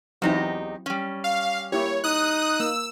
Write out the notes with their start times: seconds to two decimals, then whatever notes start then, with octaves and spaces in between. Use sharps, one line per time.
0.22 E2 F#3 C4 D#4 E4 G4
0.86 G3 C#4
1.24 F5
1.72 A#3 E4 G4 C#5
2.04 D#4 D#6 F#6
2.60 A#3 E6